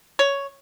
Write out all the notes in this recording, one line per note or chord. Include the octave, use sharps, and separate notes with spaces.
C#5